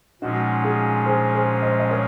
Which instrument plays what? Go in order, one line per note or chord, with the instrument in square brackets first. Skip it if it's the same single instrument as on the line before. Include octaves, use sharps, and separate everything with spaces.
[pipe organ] A#2 F3 G#3 C#4 [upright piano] D#4 F#4
[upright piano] F4 G#4
G#4 C5
G#4 C5
C5 D#5
D#5
A#4 C#5